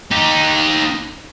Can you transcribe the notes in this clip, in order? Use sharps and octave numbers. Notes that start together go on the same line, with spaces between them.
D#4 G4